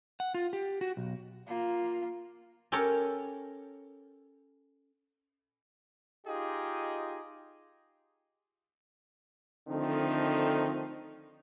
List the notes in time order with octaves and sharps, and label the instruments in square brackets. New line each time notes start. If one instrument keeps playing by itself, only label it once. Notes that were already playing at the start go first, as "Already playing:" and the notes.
[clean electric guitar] F#5
F4
G4
F#4
B1
[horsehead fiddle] A#3 F4
[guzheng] C#4 G4 A4 A#4 C#5
[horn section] D#4 F4 G4 G#4 D#5
[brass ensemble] D3 D#3 F3 A3 C4 D#4